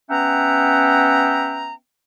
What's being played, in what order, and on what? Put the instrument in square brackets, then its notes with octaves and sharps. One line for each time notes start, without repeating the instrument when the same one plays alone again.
[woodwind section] B3 C#4 E5 F#5 G5 A#5